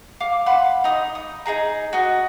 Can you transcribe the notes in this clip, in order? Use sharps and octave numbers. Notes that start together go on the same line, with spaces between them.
F5 D6
F5 F#5 B5 C6
D#4 D#6
D#6
D#4 F#4 G#4 A#5
F#4 D#5